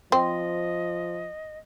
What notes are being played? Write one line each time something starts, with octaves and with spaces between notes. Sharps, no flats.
F3 C4 D#5 G5